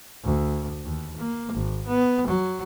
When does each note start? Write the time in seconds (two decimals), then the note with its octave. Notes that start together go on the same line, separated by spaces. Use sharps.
0.24 D2
0.83 D#2
1.17 A#3
1.52 G#1
1.87 B3
2.27 F#3